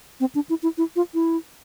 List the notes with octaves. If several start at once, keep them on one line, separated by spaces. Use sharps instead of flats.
C4
D4
E4
E4
E4
F4
E4